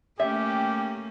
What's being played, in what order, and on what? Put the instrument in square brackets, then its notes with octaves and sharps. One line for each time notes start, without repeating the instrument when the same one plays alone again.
[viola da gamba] A3 A#3 C#4 [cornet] G4 [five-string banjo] E5